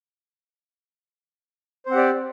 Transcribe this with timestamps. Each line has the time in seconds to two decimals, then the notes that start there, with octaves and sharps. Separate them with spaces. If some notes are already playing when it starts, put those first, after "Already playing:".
1.86 C5
1.89 C4
1.92 F#5
1.94 G4
1.97 D5